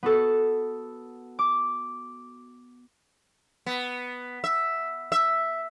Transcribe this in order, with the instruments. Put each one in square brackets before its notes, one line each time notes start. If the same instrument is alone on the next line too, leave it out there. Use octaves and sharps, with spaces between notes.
[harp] B3 F#4 A4
D6
[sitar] B3
E5
E5